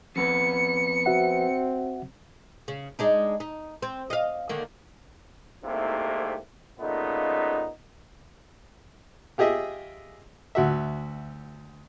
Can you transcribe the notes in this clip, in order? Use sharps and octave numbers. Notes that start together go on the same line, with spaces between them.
F2 B3 C#7
C4 F#4 E5 F#5
C#3
G#3 D4 D#4
D#4
C4
D#5 F5
D3 D#3 A#3
C2 G#2 C3 A3 A#3 E4
A#2 C#3 A3 B3 D#4
F4 G4 G#4 D#5 E5
D2 F#4 E5